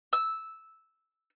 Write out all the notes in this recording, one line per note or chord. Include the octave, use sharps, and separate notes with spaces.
E6